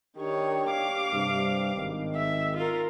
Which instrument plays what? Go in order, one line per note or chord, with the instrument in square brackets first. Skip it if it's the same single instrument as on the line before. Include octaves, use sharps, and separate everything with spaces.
[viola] D#3 C#5 [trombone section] D4 G4
[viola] F5 D6
[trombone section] G2 C3
G#1 D#3
[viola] E5
F4 A#4